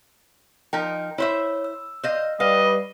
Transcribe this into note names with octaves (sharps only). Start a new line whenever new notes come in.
F3 D#4 A#4 G5
E4 C5 C#5 E5
E6
C5 D#5 F5
G3 B4 D#5 F5